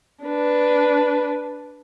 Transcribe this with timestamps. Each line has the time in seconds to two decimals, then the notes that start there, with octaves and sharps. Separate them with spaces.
0.24 D4 B4